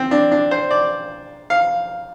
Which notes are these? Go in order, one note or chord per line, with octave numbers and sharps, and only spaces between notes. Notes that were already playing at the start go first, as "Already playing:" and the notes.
Already playing: C4
D4
D4
C5
D5
F5